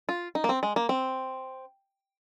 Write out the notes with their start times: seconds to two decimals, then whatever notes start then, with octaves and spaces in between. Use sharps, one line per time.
0.09 F4
0.35 D#4
0.44 A#3
0.49 C4
0.63 G#3
0.76 A#3
0.89 C4